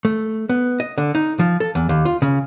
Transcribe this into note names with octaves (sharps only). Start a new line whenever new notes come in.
A3
B3
D#5
D3
D#4
F3
A4
E2
D#2
F4
C#3